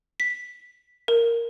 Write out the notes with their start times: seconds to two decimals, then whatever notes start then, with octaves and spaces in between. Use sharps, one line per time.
0.20 B6
1.08 A#4